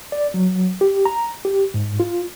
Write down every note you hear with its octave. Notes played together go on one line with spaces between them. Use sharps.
D5
F#3
G4
A#5
G4
G#2
F4